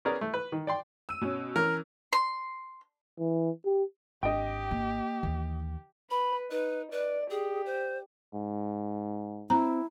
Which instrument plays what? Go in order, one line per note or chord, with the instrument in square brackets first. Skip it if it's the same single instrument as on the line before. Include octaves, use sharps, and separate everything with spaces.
[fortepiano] B3 C#4 G#4 A#4 D5
A3
B4
D#3
D5 G5 C6
[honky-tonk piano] E6 D#7
B2 C#4
[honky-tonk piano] E3 C#4 [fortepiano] A#4
[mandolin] C6
[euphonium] E3
G4
[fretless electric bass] G#1 D4 [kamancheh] G4 [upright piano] D#5 G5
[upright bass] A#3
[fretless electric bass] D#2 E3 [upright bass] D#3
[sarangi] B4 [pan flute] B5
[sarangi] D#4 [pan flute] B4
[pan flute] B4 [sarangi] D5
[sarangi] G4 [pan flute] G#4
[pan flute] C5
[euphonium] G#2
[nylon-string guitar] C4 [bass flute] E4 [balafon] A#5